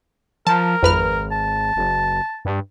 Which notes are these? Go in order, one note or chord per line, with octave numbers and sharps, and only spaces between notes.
F3 A#4 A5
G#1 F2 B4 F6
A5
F#1
G2